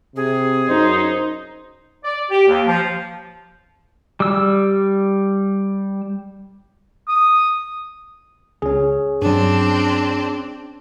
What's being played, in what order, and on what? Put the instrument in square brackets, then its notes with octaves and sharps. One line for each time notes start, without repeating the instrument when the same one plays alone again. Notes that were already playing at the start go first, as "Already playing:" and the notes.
[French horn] C3 [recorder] G#4
[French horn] F#2 [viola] D#4 [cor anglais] C5
[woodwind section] D5
G4
D#2
F3
[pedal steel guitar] G3 E6
[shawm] D#6
[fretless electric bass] C#2 [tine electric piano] C#4 G#4
[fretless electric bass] G2 F#3 [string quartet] C4 D4